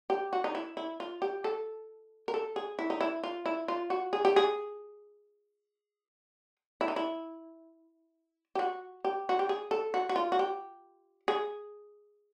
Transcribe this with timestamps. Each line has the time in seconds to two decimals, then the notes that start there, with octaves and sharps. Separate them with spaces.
0.10 G4
0.33 F#4
0.44 D#4
0.55 E4
0.77 E4
1.00 F4
1.22 G4
1.44 A4
2.28 A#4
2.34 A4
2.56 G#4
2.79 E4
2.90 D#4
3.01 E4
3.24 F4
3.46 E4
3.68 F4
3.90 F#4
4.13 G#4
4.25 G4
4.36 G#4
6.81 E4
6.88 D#4
6.96 E4
8.55 G4
8.59 F#4
9.05 G4
9.29 F#4
9.39 G4
9.49 G#4
9.71 A4
9.94 F#4
10.09 F#4
10.16 F4
10.32 F#4
10.39 G4
11.28 G#4